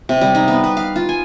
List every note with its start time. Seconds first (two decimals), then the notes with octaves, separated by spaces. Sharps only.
0.09 C3
0.21 G3
0.35 D#4
0.48 B3
0.64 B4
0.77 F5
0.96 F4
1.09 G#5